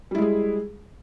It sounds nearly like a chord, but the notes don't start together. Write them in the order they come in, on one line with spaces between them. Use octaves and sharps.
G3 E4 G#3 G#4